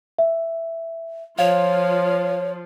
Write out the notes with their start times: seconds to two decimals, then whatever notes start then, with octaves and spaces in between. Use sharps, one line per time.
0.19 E5
1.39 F3 F4 C#5 F5